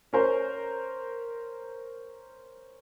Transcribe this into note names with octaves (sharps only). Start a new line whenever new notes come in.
C#4 A#4 C5